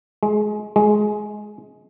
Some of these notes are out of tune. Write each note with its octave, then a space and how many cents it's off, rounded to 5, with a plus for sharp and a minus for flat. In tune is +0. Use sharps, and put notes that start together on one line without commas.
G#3 +25
G#3 +15